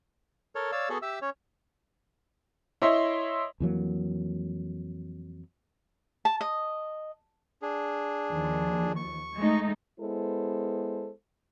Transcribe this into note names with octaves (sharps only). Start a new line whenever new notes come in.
A4 A#4 C#5
C#5 D5 F5 E6
B3 F#4 G#4 A4
G4 E5 E6
C#4 C#5
E4 C#5 D#5 E5 C6
F2 E3 F#3 A#3
A5
D#5
D4 G#4
D#2 F3
C#6
G#3 A3 D#4
G#3 B3 E4 A4 C5